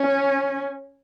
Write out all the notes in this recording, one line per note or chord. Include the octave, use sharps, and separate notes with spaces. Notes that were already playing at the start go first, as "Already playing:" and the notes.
Already playing: C#4